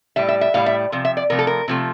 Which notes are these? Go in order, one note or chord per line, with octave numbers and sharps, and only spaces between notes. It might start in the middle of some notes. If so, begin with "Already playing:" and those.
A2 G3 E5
E5
E5
A2 G3 F5
E5
C3 F3
E5
D5
C3 F3 A3 A#4
A4
A#4
C3 F3 A3